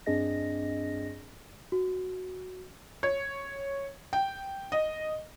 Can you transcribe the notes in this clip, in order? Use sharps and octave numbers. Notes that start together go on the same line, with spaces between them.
G2 C4 D4 G#4 D#5 A#6
F#4
C#5
G5
D#5